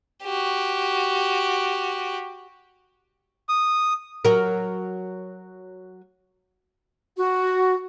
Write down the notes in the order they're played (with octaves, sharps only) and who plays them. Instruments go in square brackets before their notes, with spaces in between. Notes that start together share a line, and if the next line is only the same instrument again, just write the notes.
[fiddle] F#4 G4
[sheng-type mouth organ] D#6
[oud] F#3 A#4
[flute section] F#4